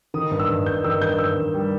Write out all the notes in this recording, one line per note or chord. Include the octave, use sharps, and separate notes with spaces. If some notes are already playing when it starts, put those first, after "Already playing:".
D#3 D#6
G2
E6
G2
G2 G6
D#3 E6
G2 G6
D#3 E6
G2
G3